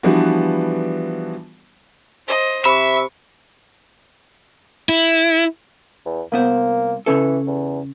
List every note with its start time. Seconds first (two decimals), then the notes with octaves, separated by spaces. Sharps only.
0.03 E3 F3 G3 B3 D4 F#4
2.27 C5 D#5
2.65 C3 E5 B5 C#6
4.89 E4
6.06 E2
6.32 C2 A#3 B3 C5
7.06 C#3 E3 C#4 A4
7.47 E2